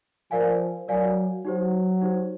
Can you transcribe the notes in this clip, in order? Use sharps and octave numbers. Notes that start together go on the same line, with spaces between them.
F3 A#4 D5 F5 G#5
F#3 A#4 D5 F5 G#5
F#3 D#4 G4 C5
D#4 G4 C5